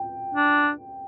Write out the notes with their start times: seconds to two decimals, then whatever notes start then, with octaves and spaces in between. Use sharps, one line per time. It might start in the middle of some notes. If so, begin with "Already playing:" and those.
Already playing: G5
0.35 D4